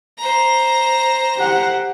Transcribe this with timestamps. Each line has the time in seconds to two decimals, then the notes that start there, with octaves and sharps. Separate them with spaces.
0.18 C5 A#5
1.37 G4 F#5